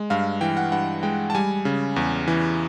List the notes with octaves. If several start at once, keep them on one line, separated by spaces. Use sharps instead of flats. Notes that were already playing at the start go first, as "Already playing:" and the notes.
Already playing: G#3
G2 F5
E3 G5
F#5
G2 F#5
G#3 G5
A5
G3 G#5
C#3
E2
E3